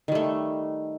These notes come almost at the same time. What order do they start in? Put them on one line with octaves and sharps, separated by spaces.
D#3 G3 A3